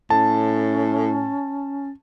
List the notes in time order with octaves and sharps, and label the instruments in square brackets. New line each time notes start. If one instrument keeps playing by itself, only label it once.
[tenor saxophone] A2 [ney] C#4 [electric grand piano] A5